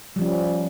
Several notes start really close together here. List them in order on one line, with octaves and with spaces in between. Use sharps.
G3 F3 C#4